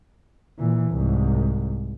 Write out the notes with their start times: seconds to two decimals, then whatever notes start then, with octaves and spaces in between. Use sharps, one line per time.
0.59 A#2 E3
0.91 C2 G#2